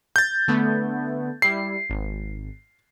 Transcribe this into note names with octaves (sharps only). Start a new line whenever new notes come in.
G6 A6
D3 A3 B3
G3 E4 C7
G#1